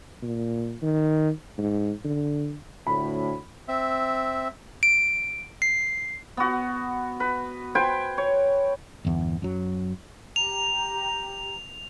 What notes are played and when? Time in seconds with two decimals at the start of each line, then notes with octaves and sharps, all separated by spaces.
0.22 A#2
0.82 D#3
1.58 G#2
2.04 D3
2.87 D2 A2 B5
3.68 C4 E5
4.83 D7
5.62 C7
6.37 B3 F#4
7.20 B4
7.75 B4 C5 G5 G#5
8.18 C#5
9.05 G1 E2
9.42 F#2 F#3
10.36 G4 A#5 F7